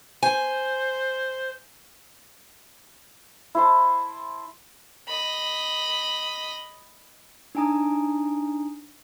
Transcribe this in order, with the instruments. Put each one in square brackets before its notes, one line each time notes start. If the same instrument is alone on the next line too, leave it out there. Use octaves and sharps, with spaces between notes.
[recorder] C5 [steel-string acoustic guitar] G#5
[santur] E4 C5 A5
[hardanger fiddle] D#5 B5
[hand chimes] D4 D#4 G#5 A#5 D#6